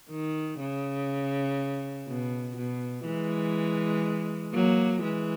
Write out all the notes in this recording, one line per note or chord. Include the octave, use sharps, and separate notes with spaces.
D#3
C#3
B2
B2
E3 G#3
F#3 A#3
E3 G#3